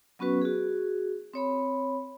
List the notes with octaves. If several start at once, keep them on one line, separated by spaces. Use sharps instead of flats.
F#3 B3 C#4 F#4 B4 C#6
F#4 G#4
C4 C#5 B5